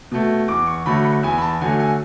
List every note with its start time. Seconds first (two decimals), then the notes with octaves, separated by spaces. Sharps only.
0.12 B2 A3
0.48 E2 D6
0.67 C#6
0.86 D3 F#3 A3 B5
1.05 B5
1.23 E2 G#5
1.38 B5
1.42 A5
1.60 D3 F#3 A3 G#5
1.80 G#5